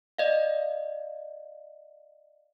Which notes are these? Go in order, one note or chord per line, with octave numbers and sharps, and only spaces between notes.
D5 D#5 F5